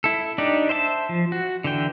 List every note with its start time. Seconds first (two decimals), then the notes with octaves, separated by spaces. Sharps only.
0.04 E4 A4
0.38 D4 D#4 G4 D5
0.69 C5 E5 G5 A5
1.09 F3
1.32 F#4
1.64 D3 E3 G5